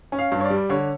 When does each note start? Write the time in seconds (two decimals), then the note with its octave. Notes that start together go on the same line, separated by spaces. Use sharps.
0.12 C#4
0.19 F5
0.32 G2
0.40 C#5
0.45 D5
0.50 G3
0.70 D3 C#5